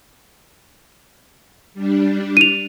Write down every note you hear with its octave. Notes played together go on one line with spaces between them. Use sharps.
G3 D4
D#7 F7